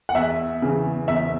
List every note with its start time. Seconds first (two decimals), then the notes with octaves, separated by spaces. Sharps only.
0.09 F#5
0.15 E2 E5
0.62 C#3 E3
1.08 E2 E5